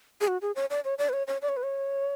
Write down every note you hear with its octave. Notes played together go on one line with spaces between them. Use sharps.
G#4
F#4
G#4
C#5
D5
C#5
D5
B4
C#5
C#5
D5
C#5
B4
C#5